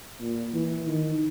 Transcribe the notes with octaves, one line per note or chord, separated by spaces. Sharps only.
A#2
E3
D#3